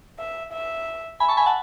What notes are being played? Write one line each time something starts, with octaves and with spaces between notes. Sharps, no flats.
E5
E5
E5 G#5 B5
A5 C#6
G#5 B5
F#5 A5